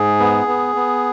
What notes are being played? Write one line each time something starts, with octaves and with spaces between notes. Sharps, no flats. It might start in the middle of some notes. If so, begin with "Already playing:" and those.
Already playing: G#2 G#4
B3
B3
B3